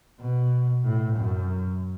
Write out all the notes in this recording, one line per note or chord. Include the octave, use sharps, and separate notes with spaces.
B2
A2
F#2